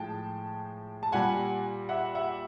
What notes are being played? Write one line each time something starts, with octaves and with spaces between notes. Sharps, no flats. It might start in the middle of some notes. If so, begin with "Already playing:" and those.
Already playing: A2 F3 G#3 G5 A5
A5
A#2 G3 F#5 G#5
E5 F#5
E5 F#5